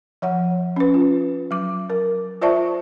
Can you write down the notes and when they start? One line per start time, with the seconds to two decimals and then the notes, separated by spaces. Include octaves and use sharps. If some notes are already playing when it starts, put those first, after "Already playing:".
0.22 F3 C#5 F#5
0.76 C#4 B4
0.94 F4
1.51 F#3 D6
1.90 A#4
2.42 F4 C5 D5 E5 A5 C#6